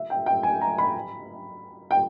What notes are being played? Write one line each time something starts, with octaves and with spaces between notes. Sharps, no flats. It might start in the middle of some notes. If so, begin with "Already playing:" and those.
Already playing: E5
G5
G5
G#5
A#5
B5
G5